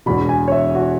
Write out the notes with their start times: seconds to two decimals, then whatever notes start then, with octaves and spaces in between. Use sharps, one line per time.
0.06 E1 E2 B2 B5
0.29 G#5
0.48 C#5
0.52 E5
0.75 F#4